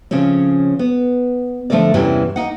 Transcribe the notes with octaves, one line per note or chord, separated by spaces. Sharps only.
C#3 F3 C4 C#4
B3
D3 F3 A3 C4 A#4 D5
E2 G2 C3 E3 G3 C#4
A#3 D#4 F#5